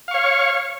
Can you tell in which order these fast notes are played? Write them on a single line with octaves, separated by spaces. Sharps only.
F5 C#6 C#5